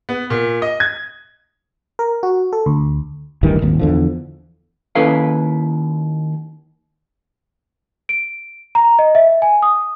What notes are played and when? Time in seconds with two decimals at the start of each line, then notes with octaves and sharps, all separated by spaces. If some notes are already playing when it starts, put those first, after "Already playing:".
0.09 B3
0.30 A#2
0.62 D#5
0.80 G#6
1.99 A#4
2.23 F#4
2.53 A4
2.66 D2
3.43 D2 G2 D#3 E3
3.61 D#1 G#1 D#2
3.79 E2 D3 F3
4.95 D#2 C#4 E4 A4 B4 F5
8.09 D7
8.75 A#5
8.99 D#5
9.15 E5
9.42 G#5
9.63 D#6